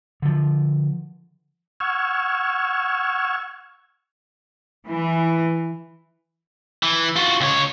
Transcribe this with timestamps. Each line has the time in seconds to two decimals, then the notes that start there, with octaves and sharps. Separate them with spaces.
0.22 D3 F3
1.80 F#5 C#6 E6 F6 G#6
4.88 E3
6.83 E3
7.16 F4 F#4
7.41 C#2 C#5